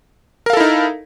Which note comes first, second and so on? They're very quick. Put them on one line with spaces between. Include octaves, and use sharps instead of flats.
A#4 F5 A4 E4 D#4